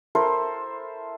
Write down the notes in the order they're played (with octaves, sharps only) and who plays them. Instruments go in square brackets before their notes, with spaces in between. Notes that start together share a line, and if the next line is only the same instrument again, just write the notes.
[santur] E4 A4 A#4 C5